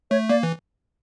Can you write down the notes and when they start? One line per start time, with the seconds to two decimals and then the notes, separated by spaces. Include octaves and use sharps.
0.11 A3 C#5
0.29 A#3 D5
0.43 E3